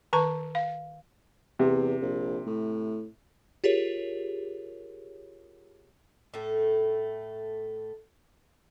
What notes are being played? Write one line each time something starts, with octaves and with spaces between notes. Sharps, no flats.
D#3 B4 A5 C#6
F5
E2 C3
A#1
A2
F4 G4 G#4 A#4 C#5
A2 A3